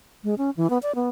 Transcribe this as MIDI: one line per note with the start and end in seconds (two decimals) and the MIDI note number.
0.24 0.34 56
0.38 0.50 61
0.57 0.70 52
0.70 0.78 59
0.83 0.95 74
0.95 1.09 59